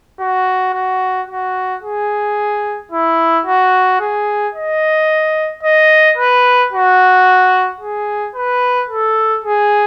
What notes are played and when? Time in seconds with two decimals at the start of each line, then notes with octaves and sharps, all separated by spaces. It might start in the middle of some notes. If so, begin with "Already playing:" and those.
0.20 F#4
0.73 F#4
1.28 F#4
1.82 G#4
2.92 E4
3.46 F#4
4.00 G#4
4.55 D#5
5.63 D#5
6.18 B4
6.72 F#4
7.81 G#4
8.35 B4
8.89 A4
9.44 G#4